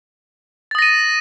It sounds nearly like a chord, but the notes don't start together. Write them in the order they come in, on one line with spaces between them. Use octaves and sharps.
A6 D#6 A#6 D#7